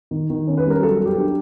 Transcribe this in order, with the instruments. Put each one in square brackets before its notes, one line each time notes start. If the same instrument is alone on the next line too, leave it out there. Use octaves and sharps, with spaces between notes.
[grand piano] D#3
D#3
C#4
B4
G3 A#4
F#3 A4
F#3
G4
D4